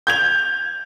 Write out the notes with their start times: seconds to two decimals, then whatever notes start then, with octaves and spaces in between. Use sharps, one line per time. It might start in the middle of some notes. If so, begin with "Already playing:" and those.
0.07 G6 G#6 F7